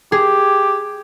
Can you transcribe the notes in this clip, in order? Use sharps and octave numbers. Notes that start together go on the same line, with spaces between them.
G4 G#4